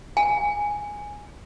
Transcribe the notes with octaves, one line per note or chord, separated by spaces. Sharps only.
G#5